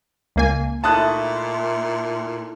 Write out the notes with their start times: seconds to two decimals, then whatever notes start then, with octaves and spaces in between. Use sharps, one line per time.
0.36 C#2 A#3 G#5
0.84 A#2 A3 D#4 E4 A5 D#6 F#6